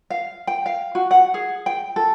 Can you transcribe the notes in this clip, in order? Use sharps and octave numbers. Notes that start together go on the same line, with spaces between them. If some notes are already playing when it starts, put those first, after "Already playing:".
F5
G5
F5
F#4
F#5
G#4
G5
A4